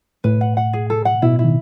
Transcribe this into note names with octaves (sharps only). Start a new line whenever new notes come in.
A2 B4
F#5
F#5
G#4
A4
F#5
B2 E4
E4
D#3